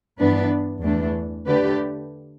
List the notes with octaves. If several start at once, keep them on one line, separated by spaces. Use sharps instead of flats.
G2 E3 B3 D4 B4
E2 E3 A3 D4
D3 A3 G4 B4 D5